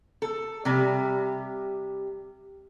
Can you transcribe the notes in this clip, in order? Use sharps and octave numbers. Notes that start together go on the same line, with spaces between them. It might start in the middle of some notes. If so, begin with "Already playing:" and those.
A4
C3 G3 G4